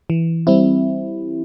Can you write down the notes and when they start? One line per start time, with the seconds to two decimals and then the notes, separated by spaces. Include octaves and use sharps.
0.10 E3
0.47 G3 C4 E4